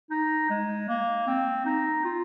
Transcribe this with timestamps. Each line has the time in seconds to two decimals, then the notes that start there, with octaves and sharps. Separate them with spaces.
0.10 D#4
0.50 G#3
0.89 A#3
1.27 C4
1.66 D#4
2.04 F4